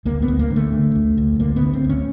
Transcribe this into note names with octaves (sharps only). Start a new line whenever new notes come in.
D2 A#3
B3
D2
A#3
D3
A3
D3
D2
D2
D3 A#3
B3
D3
C4
D2
C#4